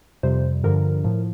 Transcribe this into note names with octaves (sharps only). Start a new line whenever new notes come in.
F2 C3 G3 C5
G2 D3 F3 A#4
A2 F3